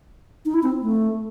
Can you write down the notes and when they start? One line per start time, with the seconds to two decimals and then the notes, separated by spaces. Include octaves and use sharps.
0.45 D#4
0.54 E4
0.63 C4
0.82 A3